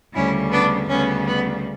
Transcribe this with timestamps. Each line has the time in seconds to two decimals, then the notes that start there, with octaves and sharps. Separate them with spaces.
0.14 D2 C#3 G3 C#4 E4
0.51 B3 D4
0.89 D2 C#3 G3 B3 C#4
1.26 B3